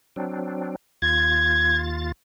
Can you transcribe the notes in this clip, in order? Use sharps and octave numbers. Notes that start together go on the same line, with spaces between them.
F#3 C4 D4
D#2 F4 G#6 A6